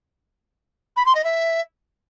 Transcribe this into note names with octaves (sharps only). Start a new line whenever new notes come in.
B5
C6
D#5
E5